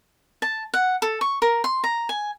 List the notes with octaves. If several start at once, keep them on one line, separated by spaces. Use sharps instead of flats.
A5
F#5
A4
C#6
A#4
C6
A#5
G#5